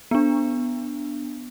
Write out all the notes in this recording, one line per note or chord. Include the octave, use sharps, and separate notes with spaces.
B3 D4